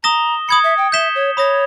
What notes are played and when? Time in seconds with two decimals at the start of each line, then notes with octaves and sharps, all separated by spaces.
0.04 A#5 D#6 A#6 E7 G7
0.48 B5 D#6 G#6 C#7
0.64 E5
0.77 G5
0.92 E5 G6 B6 E7 G7
1.15 C#5
1.37 C#5 B5 D#6 A#6